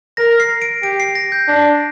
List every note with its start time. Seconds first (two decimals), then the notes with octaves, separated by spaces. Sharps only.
0.17 A#4 A#6
0.40 C7
0.62 D7
0.82 G4 D7
1.00 C7
1.15 A#6
1.32 G6
1.48 D4